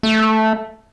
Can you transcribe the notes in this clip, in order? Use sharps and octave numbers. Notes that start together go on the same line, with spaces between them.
A3